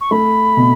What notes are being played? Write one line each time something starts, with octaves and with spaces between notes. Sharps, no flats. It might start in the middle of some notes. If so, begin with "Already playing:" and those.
C#6
A3 B5
B2